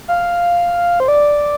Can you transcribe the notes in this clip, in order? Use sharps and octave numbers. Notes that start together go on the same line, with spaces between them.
F5
C5
D5